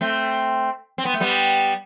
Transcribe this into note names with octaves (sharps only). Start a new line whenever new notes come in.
A3 C4
C4
B3
A3
G3 B3